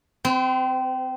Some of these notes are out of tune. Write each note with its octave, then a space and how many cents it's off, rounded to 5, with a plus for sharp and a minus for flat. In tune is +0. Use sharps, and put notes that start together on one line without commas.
C4 -20 C5 -45